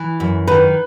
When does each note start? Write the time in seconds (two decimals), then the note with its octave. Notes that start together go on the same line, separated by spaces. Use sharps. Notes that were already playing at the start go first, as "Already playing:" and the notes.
Already playing: E3
0.20 F#2
0.47 D#3 B4